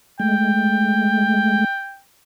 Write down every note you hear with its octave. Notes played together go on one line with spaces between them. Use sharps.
G#3 A3 G5